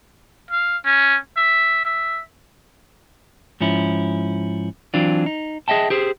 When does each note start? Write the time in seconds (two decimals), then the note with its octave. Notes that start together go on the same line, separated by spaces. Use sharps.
0.51 F5
0.86 C#4
1.37 E5
1.85 E5
3.61 G#2 F3 C#4 E4
4.94 E3 F#3 C4 D4 F4
5.26 D#4
5.68 G#4 D#5 E5 G5 A5
5.90 G4 G#4 C5